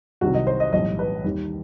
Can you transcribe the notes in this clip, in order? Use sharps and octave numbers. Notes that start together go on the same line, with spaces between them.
C2 C3 D#3 F#3 F#4
D#5
C5
D#5
B1 A2 E3 G3 D#5
B4
D#2 D#3 G3